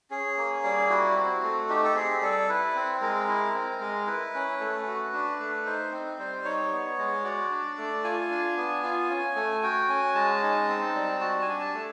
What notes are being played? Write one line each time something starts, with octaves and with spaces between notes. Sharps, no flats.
C#4 G#4
A#3
G3
E4 F#4
C4
A3
D#4 G4
A4
C4 G#4
G3 A4
E4 B4
C4
G#3 A#4
E4
C4
G#3
E4 B4
C#4
A3
F#4
D4
A3
D#4 C5
C4
G3 C5
D#4 C#5
B3
G#3
F#4 D5
D4
A3
F4 G#5
D4
B3
F4 G#5
C#4
A3
F#4 G5
C#4 G#5
G#3 A5
D#4
C4
G3
F#4 A5
G#5
D4
A5
A3